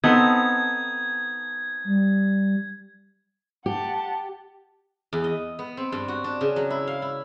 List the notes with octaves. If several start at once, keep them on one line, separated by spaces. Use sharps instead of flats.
B3 C4 D#4 A4 A5 D#6 G#6
G3
G4 F#5 A5
E2
D#5
B3
C4
G2
F#4
D4
C#3
F#3
E4
F5
E4